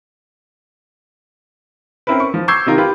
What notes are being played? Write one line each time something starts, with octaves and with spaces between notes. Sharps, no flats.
C4 C#4 E4 A#4 B4
C#6
F3
C#6 D6 E6 G6 G#6 C7
C3 D#3 D#4 F4 A#4
F4 G4 B4